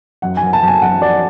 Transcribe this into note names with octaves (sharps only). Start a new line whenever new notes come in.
F#2 F#5
G#5
F#2
A5
F#2 G#5
F#2 F#5
F3 D5